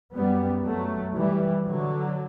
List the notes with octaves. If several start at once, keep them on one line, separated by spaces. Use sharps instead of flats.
F#2 G3 B3
F#3 A3
E3 G3
D3 F#3